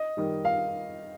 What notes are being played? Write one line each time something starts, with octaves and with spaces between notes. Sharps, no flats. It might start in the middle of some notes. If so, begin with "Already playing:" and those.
Already playing: D#5
D#3 G3
F5